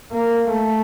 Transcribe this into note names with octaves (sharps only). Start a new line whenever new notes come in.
A#3
A3